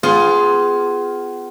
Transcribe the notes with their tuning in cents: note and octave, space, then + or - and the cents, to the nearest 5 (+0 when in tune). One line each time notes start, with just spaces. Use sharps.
B3 +35 F4 +0 G#4 +0